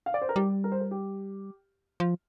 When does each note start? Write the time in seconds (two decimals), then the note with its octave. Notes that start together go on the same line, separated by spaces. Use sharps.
0.06 F5
0.14 D5
0.22 C5
0.29 A#4
0.36 G3 G4
0.64 A#4
0.72 C5
0.80 A#4
0.91 G4
2.00 F3